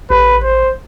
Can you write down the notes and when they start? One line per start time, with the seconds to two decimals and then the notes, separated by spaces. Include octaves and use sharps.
0.10 A1 B4
0.43 C5